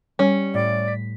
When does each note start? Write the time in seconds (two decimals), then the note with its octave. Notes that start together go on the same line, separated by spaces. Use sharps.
0.19 G3 C#4 G#5
0.54 A2 D5
0.88 B6